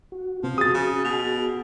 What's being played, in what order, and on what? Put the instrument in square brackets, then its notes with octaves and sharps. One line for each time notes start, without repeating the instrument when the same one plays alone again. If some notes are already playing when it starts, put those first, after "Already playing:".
[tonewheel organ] F#4
[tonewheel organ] C3 B3 C4 [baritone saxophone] F3
[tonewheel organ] F#4 G#4 [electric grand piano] D#6 A6
[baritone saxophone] C#3
B2